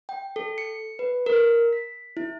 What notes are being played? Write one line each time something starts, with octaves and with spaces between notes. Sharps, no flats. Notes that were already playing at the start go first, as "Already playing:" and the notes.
G5
A4
C#7
B4
A#4
B6
E4